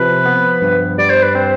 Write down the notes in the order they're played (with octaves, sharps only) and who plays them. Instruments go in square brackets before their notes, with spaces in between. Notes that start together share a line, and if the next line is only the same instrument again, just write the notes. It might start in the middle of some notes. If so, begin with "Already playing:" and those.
Already playing: [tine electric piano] C3 F3 [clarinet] B4
[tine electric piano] B3
G2
[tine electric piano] G3 [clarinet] D5
[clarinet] C5
B4
[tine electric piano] C4 [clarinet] C5